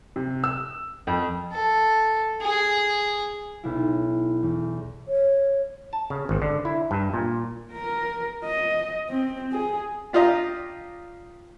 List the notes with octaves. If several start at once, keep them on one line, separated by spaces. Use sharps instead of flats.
C3
E6
F2
A4
G#4
B1 E4
E2
C#5
A5
C#3
G#1
D3
E4
G2
A#2
A#4
D#5
C4
G#4
D4 F4 G4 D#5 A#5